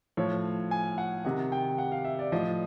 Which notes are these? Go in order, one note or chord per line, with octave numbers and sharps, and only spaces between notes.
A2 F3 C#5
G#5
F#5
C3 D#3 F#5
G5
F#5
F5
E5
D5
A2 F3 D#5